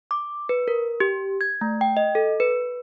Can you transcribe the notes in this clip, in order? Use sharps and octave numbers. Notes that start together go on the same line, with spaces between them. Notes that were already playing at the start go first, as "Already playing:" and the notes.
D6
B4
A#4
G4
G#6
A3
G5
D#5
A4
B4